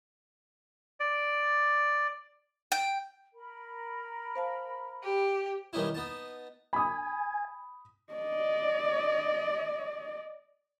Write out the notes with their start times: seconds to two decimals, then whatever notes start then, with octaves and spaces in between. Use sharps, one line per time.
1.00 D5
2.72 G5
3.34 A#4 B5
4.35 C5 F5 A5
5.03 G4
5.73 D#3 G3 B3 C#4 D#4 E4
5.95 B3 D#4 A5
6.73 G#5 B5 D#6
8.13 D5 D#5